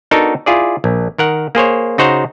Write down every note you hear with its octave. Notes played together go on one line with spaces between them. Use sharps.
B3 D4 D#4 F#4 A4 A#4
E4 F4 G#4 D5
A#1
D#3 A#4 F#5
A#3 G#4 C5 C#5
C#3 D#4 F#4 C5 F#5 A#5